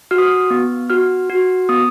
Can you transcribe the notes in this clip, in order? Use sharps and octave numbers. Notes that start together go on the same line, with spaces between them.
F#4 F6
D#6
F6
B3
F#4 F6
F#4
B3 D#6